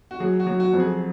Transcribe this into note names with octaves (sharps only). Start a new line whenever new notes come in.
F#4
F#3 G#4
F#4
F#3
F#4
F2
G#4